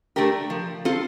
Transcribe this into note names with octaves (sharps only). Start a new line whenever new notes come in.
A3 D4 G4 A#4
F3
C4 F4 A4